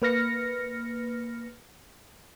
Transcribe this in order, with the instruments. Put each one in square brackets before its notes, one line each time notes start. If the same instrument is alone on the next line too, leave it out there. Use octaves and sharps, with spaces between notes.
[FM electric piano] A#3 B4 F6 A#6 C#7